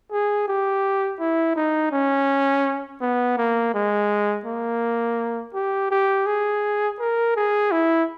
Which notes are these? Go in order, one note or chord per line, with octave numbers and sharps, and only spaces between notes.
G#4
G4
E4
D#4
C#4
B3
A#3
G#3
A#3
G4
G4
G#4
A#4
G#4
E4